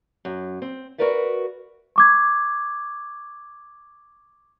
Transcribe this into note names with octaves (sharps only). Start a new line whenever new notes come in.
F#2
C4
F#4 G#4 A#4 B4 D5 E5
C#6 D6 G#6